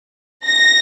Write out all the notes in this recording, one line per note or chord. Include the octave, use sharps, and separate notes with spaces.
A#6